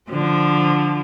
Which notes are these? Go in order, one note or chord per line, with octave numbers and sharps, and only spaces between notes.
D3 F3